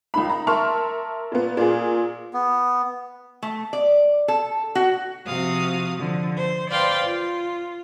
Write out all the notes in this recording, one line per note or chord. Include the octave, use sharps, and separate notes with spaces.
C#2 D#4 B5
A#5
A#4 E5 A5 C6 C#6 F6
A#2 B3
A#2 G#4
B3
A3
D5
A4
F#4
C3 F3 F#4 F5 D#6
D3 F3
C5
B4 C5 D5 F5 G5 C6
F4